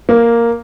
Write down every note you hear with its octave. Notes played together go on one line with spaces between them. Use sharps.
A#3